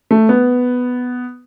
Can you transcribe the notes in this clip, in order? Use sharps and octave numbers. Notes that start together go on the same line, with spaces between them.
A3
B3